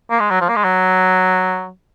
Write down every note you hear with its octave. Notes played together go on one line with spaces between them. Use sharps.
A#3
G#3
F#3
F3
A#3
G#3
F#3